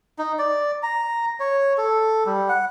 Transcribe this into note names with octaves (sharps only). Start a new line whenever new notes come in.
D#4
D5
A#5
C#5
A4
G3
F#5